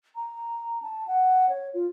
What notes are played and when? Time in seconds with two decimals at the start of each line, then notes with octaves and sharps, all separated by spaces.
0.15 A#5
0.82 A5
1.07 F#5
1.49 C#5
1.74 F4